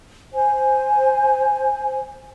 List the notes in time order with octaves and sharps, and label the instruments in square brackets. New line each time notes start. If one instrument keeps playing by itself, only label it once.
[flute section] C5 G#5